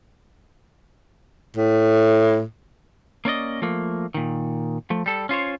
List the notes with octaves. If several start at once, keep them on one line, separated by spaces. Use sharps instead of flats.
A2
A#3 C#4 D5 D#5
F3 A3 A#3
A#2 D#3
F3 A3
G3 A4
C#4 F4 C5 C#5